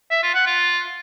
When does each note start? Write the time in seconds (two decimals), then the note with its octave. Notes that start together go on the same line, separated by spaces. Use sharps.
0.11 E5
0.23 F4
0.35 F#5
0.46 F4